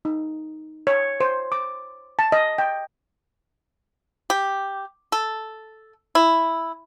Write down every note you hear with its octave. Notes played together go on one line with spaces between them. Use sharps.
D#4
C#5
C5
D6
A5
D#5
G5
G4
A4
E4